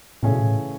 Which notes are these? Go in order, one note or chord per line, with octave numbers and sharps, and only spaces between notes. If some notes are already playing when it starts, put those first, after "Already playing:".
A2 C#3 E3 A3 C#4 G#4
B2
A2